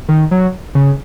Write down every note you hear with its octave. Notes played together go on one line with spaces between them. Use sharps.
D#3
F#3
C#3